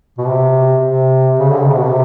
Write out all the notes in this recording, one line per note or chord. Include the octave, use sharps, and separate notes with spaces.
B2
C3
C3
C#3
D3
C#3
C3
B2
C3